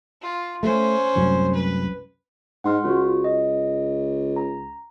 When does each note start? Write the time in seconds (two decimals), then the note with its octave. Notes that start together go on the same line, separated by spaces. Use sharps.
0.22 F4
0.63 A3 C#4 C5
1.15 C2 F#2 A2
1.54 B4
2.64 G#2 F#5 C6 F6
2.84 C#2 F4 F#4
3.24 D#5
4.36 A#5